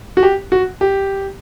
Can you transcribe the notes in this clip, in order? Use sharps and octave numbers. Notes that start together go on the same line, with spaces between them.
F#4
G4
F#4
G4